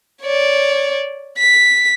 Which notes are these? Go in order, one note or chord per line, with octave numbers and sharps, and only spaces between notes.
C#5 D5
B6